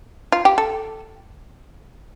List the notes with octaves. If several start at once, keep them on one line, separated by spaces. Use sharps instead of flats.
F4
G4
A4